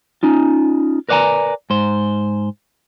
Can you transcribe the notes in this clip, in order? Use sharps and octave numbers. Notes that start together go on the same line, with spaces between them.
C#4 D#4 F4
A#4 B4 D5 F5 G#5 A#5
G#2 C5